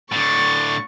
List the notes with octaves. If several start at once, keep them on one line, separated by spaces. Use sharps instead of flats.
A2 D3 C#6 A6